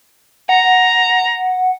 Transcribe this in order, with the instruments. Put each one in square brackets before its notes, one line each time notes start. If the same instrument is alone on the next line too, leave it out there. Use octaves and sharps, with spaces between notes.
[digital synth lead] F#5 [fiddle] A#5